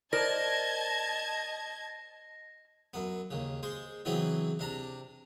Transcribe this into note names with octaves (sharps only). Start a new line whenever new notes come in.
A#4 C5 D5 D#5 A5 G#6 A#6
F#2 B3
D#2 C#3
G#3 C5
C#3 E3 F#3 B3 C4
C3 D4 A#5